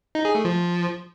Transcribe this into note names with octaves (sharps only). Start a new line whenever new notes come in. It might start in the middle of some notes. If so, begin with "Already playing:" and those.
D#4
G#4
A3
F3